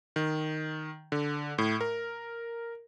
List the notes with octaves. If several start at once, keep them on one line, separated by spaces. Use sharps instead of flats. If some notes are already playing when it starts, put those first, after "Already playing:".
D#3
D3
A2
A#4